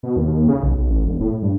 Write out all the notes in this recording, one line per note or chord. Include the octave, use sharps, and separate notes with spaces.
B2
D#2
C#3
B1
B1
A1
E1
A2
G2